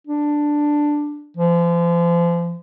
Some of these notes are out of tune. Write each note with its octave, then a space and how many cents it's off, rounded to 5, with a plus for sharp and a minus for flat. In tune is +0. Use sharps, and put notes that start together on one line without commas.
D4 +5
F3 -35